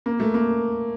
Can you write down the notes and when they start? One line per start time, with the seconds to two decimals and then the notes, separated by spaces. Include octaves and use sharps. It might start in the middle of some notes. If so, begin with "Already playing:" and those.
0.06 A#3
0.20 A3
0.34 A#3